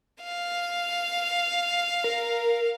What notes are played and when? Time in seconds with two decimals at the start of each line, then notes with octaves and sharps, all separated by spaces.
0.24 F5
2.04 A#4